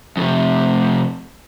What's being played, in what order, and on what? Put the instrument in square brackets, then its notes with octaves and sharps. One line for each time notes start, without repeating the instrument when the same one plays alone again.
[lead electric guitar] F2 C3